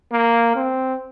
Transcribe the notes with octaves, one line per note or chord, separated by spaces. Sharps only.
A#3
C4